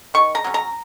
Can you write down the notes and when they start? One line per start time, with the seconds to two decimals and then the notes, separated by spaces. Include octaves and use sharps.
0.14 D#3 C#6
0.35 A#5
0.44 F#3 C#4
0.54 A#5